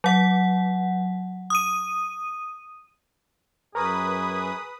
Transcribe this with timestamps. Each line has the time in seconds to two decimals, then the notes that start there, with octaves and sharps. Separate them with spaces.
0.04 F#3 F#5
1.50 D#6 D#7
3.75 F#2 G#4 A#4 B4 A#5 C#6 D#6